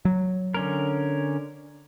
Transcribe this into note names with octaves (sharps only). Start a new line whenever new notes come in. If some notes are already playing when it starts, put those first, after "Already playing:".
F#3
D3 C#4 A#4